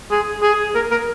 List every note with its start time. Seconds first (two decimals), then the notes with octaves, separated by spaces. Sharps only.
0.11 G#4
0.43 G#4
0.76 A#4
0.91 A#4